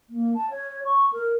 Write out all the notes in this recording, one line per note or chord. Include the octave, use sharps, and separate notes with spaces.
A#3
A5
C#5
C#6
A#4